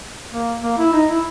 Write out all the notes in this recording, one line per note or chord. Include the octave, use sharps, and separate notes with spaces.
A#3
A#3
E4
D#4
E4